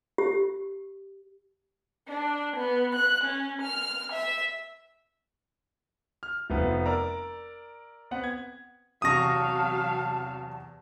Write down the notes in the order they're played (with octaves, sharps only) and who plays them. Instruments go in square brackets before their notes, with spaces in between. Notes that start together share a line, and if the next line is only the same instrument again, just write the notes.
[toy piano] G4
[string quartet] D4
B3
F#6
C#4
F6
E5
[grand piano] F6
F1 F3 B3
A#4 D5 A#5 E6
B3 C4 B4 F#5
G#6
[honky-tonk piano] E2 C3 C#6 [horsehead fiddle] F#3 F5 [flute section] A5 [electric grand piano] D#6 A#6